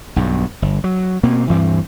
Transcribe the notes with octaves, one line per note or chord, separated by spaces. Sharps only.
B1 G2
G1
F#3
B2 A#3 C4
D2 G2 E3 C4